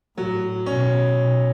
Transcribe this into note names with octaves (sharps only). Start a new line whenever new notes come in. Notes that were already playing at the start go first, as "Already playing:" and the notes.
A2 F#3
B2 C#4
B2